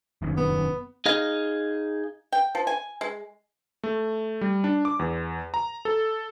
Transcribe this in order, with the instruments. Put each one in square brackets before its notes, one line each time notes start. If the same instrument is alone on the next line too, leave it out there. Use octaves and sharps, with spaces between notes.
[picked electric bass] F1 F#2 D#3
[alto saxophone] B3
[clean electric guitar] D#4 G#4 D#5 F5
[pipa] G5
F3
G#5
G#3
[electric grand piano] A3
G3
D4
D6
E2
A#5
A4